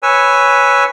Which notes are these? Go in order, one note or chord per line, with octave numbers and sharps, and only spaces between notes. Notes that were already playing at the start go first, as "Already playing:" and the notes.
B4 C#5 G#5 E6